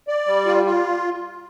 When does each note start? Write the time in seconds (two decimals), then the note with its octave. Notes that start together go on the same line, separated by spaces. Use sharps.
0.08 D5
0.27 G3
0.46 F4
0.65 F4